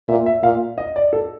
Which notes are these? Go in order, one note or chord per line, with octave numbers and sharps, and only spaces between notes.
A#2 E5
E5
A#2 F5
D#5
D5
A4